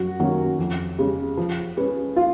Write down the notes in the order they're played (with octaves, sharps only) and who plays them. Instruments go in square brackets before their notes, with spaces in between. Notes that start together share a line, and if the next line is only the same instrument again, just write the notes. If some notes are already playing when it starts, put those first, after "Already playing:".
Already playing: [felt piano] F#2 [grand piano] F#4
[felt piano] D#3 F#3 A#3 C#4
F2
C#3 G#3
F3
G#3 C#4 G#4 B4
[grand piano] F4